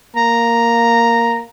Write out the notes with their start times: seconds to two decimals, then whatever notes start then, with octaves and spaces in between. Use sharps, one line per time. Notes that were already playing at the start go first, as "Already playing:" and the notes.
0.16 A#3 A#5